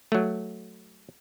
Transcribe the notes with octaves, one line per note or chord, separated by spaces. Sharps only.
F#3 A3